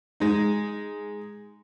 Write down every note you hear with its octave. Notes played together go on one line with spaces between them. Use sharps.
G#3 D#4